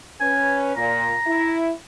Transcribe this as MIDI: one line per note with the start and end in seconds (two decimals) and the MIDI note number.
0.20 0.76 61
0.20 0.76 71
0.20 0.59 80
0.77 1.13 46
0.77 1.56 82
1.27 1.72 64